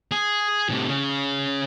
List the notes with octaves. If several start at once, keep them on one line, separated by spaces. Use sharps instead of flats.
G#4
A2 C3
C#3